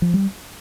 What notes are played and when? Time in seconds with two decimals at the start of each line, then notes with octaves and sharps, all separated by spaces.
0.02 F3
0.14 G3